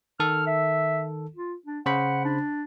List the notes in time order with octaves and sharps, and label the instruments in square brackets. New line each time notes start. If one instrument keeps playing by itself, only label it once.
[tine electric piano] D#3 A4 [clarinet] F6
[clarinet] E5
F4
D4
[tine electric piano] C#3 C5 B5 [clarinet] F#5
[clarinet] D4